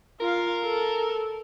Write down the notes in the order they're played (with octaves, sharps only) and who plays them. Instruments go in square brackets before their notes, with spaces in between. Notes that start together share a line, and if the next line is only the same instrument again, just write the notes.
[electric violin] F4 F5 [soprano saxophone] A#4
[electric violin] A4